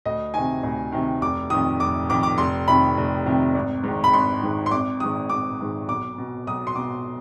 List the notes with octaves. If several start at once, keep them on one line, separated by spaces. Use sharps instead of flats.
D2 D#5
C3 D#3 G#5
D2
C3 D#3
F1 D6
F2 D#3 D#6
F1 D6
F2 D#3 D6
D6
F1 C6
F2 C3 D#3 B5
F1
F2 C3 D#3
G#1
G#2 D#3
B5
G#1 C6
G#2 D#3
C6
G#1 D6
G#2 D#3 D#6
G#1 D6
G#2 D#3
B1 D6
B2
B1 D#6
C6
B2 D6